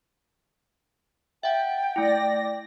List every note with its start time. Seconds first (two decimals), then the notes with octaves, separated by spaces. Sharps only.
1.43 E5 F#5 G5
1.96 A3 E4 D5 A#6